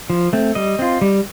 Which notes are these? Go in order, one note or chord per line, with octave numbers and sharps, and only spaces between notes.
F3
A3 C4
G3 D#5
C4 F4
G3